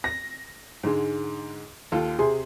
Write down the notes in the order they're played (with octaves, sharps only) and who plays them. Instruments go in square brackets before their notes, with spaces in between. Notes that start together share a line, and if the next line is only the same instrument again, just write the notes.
[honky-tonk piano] A#6
[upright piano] G#2 D3 G#3
D#2 F4 A4
[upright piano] C3 C6 [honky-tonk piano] G#4